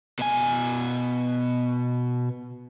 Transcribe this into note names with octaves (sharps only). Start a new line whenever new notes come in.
B2 G#5